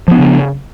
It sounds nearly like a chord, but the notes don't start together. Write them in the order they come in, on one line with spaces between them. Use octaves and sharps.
F3 B3 D4 C#3